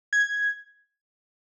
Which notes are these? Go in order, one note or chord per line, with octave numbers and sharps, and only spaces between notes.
G#6